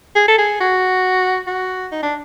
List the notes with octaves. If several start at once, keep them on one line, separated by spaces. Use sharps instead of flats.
G#4
A4
G#4
F#4
F#4
D#4
D4